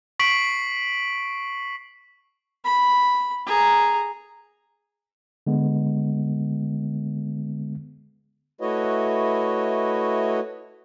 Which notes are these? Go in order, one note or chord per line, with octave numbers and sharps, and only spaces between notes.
C#6 B6 C7 D7 F#7
B5
G#4 A#5
D3 G#3 B3
A3 E4 F#4 B4 C#5 D#5